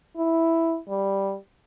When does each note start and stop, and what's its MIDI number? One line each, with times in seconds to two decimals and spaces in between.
0.17 0.77 64
0.89 1.35 55